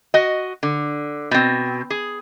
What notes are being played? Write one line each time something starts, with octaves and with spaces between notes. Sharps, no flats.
F#4 D#5
D3
B2 C4
G#4